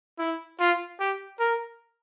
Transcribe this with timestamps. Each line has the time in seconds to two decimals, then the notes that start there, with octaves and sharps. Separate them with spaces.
0.19 E4
0.59 F4
0.99 G4
1.39 A#4